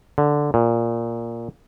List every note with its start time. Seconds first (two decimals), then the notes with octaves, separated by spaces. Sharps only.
0.18 D3
0.54 A#2